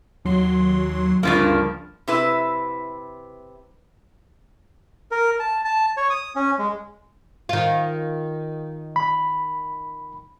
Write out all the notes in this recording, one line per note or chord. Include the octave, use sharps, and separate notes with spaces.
D#2 F#3 C6
D2 G2 C#3 F3 A#3
C3 E4 B4 E5
A#4
A5
A5
C#5
D#6
C#4
G#3
D#3 F4
B5